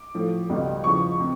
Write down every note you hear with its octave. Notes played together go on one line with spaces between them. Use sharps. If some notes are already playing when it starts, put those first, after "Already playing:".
Already playing: D6
A2 F3
C#2 B2 G3
E2 C#3 F3 C#6
C3